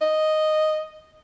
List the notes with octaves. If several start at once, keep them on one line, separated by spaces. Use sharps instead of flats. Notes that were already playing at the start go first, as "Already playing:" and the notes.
D#5